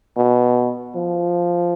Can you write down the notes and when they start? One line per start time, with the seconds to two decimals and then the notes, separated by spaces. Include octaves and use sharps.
0.17 B2
0.96 F3